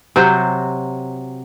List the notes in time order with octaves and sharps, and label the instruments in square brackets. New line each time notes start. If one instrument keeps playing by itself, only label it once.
[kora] C3 F#3 F#4 C5